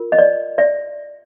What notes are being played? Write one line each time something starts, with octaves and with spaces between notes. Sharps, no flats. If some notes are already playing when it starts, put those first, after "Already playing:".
Already playing: F4 A#4
D#5
D5
D5 E5